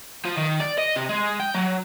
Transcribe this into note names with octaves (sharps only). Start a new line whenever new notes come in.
F3
D#3
D5
D#5
C3
G#3
G5
F#3